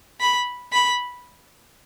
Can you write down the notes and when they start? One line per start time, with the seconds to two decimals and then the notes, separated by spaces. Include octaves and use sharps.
0.20 B5
0.73 B5